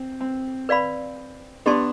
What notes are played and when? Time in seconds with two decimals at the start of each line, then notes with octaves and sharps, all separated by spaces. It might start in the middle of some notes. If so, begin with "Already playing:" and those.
Already playing: C4
0.21 C4
0.69 B4 D5 F5 B5
1.66 B3 D4 G4 D5 A5 C6